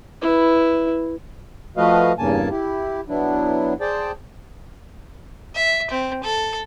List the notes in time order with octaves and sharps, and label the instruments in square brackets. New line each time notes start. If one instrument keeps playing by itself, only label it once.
[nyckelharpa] E4 B4
[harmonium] F3 A3 F#4 B4 D#5 F5
E2 G2 C#3 A#3 G#5 A5
E4 G4
F#3 B3 D4 E4
G#4 C5 D5 G5 A5
[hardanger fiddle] E5
C4
A4